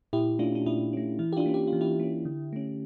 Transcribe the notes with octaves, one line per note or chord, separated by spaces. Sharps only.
A#2 E4 G4
A3 C#4 D4 F4
D4
A#2 E4
A3 C#4
E3 E4
G4
D4 F4
A#3 C#4
G4
F4
E3
E4 G4
A#3 C#4
D3
A3 C#4